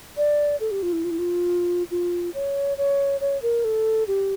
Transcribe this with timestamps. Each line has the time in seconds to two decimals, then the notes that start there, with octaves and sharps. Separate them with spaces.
0.17 D5
0.60 A4
0.71 G4
0.83 F4
0.93 E4
1.04 F4
1.11 E4
1.19 F4
1.91 F4
2.34 C#5
2.78 C#5
3.21 C#5
3.42 A#4
3.64 A4
4.08 G4